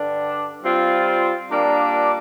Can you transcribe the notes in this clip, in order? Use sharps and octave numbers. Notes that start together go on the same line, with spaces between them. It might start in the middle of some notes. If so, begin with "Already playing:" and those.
Already playing: G2 D3 G3 D4
G3 C4 F4
A#2 G3 A#3 D4